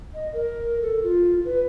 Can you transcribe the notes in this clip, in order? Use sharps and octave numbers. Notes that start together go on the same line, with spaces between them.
D#5
A#4
A4
F4
B4